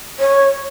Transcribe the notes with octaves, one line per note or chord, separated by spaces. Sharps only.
C#5